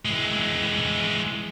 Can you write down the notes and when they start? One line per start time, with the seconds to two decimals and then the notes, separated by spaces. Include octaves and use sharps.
0.05 E3 G#3